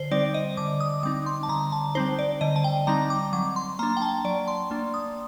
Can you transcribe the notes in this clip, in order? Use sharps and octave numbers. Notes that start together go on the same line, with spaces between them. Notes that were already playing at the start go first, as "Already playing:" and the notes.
Already playing: D3 C5
G3 C4 D#4 D5
D#5
D3 D6
D#6
G3 C4 D#4 D6
C6
A5
D3 A#5
A5
G3 C4 D#4 C5
D5
D3 D#5
A5
G5
G3 C4 D#4 A#5
D6
F#3 D6
C6
A#3 D4 A#5
G5
A5
F#3 D5
C6
A#3 D4
D#6